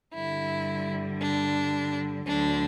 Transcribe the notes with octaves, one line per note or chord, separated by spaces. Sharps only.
G2 D3 G3 E4
D4
D2 D3 F#3 D4